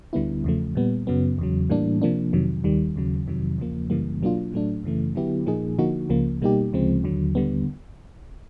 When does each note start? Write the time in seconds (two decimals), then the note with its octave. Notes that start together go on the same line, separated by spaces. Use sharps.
0.13 D2 D3 G3 B3 E4
0.44 E2 C#3 F3 A3
0.75 A#2 G3 B3
1.07 F#2 C#3 F#3 B3
1.38 E2 C#3 F#3
1.70 A2 E3 G3 A#3 D4
2.02 C3 F3 A#3 D4
2.33 F2 C3 D#3 F#3
2.64 D#2 D#3 G3
2.96 D#2 C#3 F#3
3.27 F2 C3 D#3 F#3
3.58 E2 C#3 F3 A#3
3.90 F#2 C#3 E3 G3 A#3
4.22 B2 F#3 A#3 D4 F4
4.52 A2 F#3 A3 D4
4.84 F#2 C#3 E3 A3
5.15 D3 F#3 B3 E4 G4
5.46 A#2 F3 A#3 D#4 G#4
5.78 D3 F3 A#3 D#4 F#4
6.09 C#2 C#3 F3 A#3
6.42 B2 G3 A#3 D#4 G4
6.73 D2 C#3 F3 G#3 C4
7.04 D#2 D3 F#3
7.35 D#2 D3 G3 B3